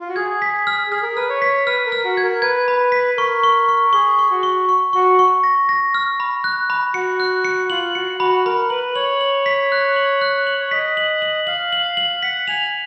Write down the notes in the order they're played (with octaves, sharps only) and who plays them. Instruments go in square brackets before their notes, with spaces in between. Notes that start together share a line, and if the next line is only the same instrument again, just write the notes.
[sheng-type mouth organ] F4
F#4
[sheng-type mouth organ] G#4 [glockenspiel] G#6
[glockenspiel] B6
F6
[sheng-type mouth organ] G#4 [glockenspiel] F6
[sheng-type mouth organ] A#4
[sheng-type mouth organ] B4 [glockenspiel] F6
[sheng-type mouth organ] C#5
[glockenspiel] B6
[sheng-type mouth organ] B4 [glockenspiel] F6
[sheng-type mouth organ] A#4
[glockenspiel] F6
[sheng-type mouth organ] F#4
[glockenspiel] G#6
[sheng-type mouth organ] A#4
[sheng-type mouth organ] B4 [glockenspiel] G#6
[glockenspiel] B5
B6
[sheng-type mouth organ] A#4 [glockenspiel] C#6
[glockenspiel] C#6
C#6
[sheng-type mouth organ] G#4 [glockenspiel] C#6
[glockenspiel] C#6
[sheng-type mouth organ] F#4
[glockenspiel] C#6
C#6
[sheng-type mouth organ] F#4 [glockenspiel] C#6
[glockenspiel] C#6
A#6
A#6
F6
B5
F#6
B5
[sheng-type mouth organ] F#4 [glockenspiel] C#7
[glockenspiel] F#6
C#7
[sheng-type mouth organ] F4 [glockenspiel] F#7
[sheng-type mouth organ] F#4 [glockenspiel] C#7
[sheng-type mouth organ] F#4 [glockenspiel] B5
[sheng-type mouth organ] A#4 [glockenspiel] B5
[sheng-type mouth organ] B4 [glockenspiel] F#7
[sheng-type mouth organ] C#5 [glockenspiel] F#7
[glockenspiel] F#7
B6
F#6
F#7
F#6
F#7
[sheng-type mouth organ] C#5
[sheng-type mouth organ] D#5 [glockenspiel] B6
[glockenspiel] F#7
F#7
[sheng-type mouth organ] F5 [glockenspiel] F#7
[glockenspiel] F#7
F#7
[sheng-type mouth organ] F#5 [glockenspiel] B6
[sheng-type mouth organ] G#5 [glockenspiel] F7